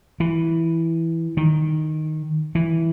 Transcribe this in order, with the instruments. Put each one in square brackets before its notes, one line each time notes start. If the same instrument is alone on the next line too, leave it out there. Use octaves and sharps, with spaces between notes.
[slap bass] E3
D#3
E3